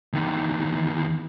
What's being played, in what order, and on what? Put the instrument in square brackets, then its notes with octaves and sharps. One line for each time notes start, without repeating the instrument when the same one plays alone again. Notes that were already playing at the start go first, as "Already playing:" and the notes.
[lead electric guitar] E2 D#3